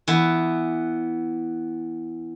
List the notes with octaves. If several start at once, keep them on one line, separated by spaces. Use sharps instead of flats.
E3 B3